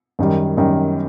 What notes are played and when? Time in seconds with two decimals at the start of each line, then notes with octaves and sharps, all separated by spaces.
0.19 F#2 D#3 G3
0.57 F#2 D#3 G3